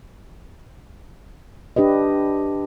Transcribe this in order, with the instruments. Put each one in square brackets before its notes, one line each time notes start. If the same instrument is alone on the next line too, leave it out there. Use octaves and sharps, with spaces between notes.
[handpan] D4 G4 B4 D#5